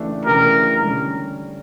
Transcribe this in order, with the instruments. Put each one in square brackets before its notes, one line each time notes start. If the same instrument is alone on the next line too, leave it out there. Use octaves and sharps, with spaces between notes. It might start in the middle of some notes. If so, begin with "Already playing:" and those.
Already playing: [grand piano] C#3 E3 A3 D4 G4
[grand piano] C#3 E3 A3 D4 G4 [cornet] A#4
[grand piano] D3 G3 C#4